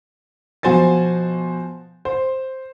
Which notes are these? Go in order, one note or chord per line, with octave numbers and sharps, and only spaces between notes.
B2 F3 F#4 C5 G#5 A6
C5